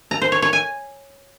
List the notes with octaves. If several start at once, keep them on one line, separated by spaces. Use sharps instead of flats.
A#5
C5
C#5
C#5
G#5